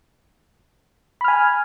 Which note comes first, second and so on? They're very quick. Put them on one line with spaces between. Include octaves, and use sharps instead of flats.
B5 F6 G#5